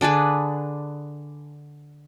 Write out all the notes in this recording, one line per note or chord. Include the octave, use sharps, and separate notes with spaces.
D3 D4 G#4 B4